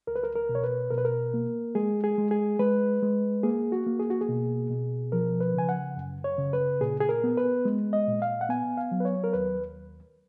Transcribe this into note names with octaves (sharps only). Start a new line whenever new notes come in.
C#2 A#4
B4
A#4
A#4
B2
C#5
B4
B2 A#4
B4
A#4
A#3
G#3 G#4
G#4
G#3
G#4
G#3 B4
G#3
A#3 G#4
F#4
A#3
G#4
F#4
G#4
B2
B2
F3 A#4
B4
C#3 G#5
F#5
F#2
C#5
C#3
B4
A#2 G#4
G#4
A#4
B3
B4
G#3
D#5
A#2
F5
F#5
B3 G#5
F5
F#3
B4
C#5
A#4
D#2 B4